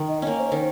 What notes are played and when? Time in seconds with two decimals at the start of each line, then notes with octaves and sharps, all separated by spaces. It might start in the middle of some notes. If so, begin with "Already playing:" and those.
Already playing: D#3
0.08 D#5
0.22 A#3 C#4 C#5
0.38 C5
0.52 D#3 C5